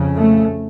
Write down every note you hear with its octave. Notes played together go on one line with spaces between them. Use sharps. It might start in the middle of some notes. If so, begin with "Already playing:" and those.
Already playing: F2 C#3
A3